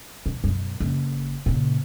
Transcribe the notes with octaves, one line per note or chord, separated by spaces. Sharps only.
B2
F#2 B2
F#1
A#2 C#3